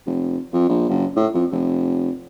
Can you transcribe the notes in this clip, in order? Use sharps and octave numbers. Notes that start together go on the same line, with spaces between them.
F1
F2
A#1
F#1
A2
F2
F1